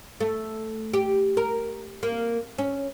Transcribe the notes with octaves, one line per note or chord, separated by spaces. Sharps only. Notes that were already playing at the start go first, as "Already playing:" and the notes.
A3
G4
A#4
A#3
C#4